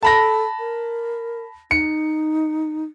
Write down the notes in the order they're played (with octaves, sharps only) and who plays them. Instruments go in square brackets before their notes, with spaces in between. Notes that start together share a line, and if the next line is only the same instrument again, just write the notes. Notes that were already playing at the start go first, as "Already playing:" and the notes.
[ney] A4 [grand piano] A5 B5 A#6
[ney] A#4
[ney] D#4 [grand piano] C#7